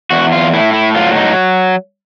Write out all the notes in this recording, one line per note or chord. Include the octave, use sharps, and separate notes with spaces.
E2 F#4
F4
A2 E4
E4
F#3 F4
D#4